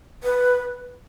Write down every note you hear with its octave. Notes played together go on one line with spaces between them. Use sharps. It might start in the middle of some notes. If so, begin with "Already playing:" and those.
B4